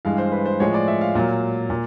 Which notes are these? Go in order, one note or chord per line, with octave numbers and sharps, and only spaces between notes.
G2 E3 G#3 F5
C5
B4
C5
A2 F3 G#3 C#5
D5
E5
F5
A#2 F#3
A#2